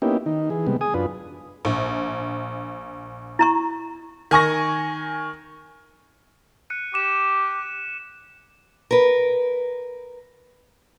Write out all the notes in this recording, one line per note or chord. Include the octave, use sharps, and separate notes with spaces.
A#3 B3 C#4 D#4 E4 G4
D#3 D#4
E3 G#4
C3 G3 G#3 B3
G#4 G#5 D#6
F#2 D4 F4 B4
A#1
E4 A#5 C#6
D#3 G#5 C#6 A#6
F#6 C#7 D#7
G4 D6 F#6 E7
A#4 B4